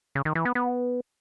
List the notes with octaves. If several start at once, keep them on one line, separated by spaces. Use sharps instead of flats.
C#3
D#3
E3
B3
B3